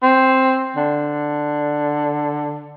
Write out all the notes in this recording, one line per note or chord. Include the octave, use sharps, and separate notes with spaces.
C4
D3